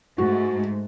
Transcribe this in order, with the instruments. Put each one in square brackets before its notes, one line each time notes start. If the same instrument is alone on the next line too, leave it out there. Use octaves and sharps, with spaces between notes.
[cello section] G#2 A3 [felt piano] F#4